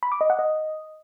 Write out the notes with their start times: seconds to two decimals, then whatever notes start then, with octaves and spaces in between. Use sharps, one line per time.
0.03 B5
0.12 D6
0.21 D#5
0.30 F#5
0.39 D#5